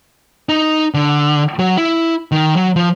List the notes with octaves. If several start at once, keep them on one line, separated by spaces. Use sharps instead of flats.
D#4
D3
F#3
E4
D#3
F#3
F3